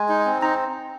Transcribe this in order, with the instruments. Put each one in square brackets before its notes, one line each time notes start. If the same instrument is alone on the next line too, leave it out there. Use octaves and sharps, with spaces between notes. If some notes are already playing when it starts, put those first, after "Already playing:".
Already playing: [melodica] G#3 [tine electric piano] G#5
[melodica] D#4
C4
[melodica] D#4 [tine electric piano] A#5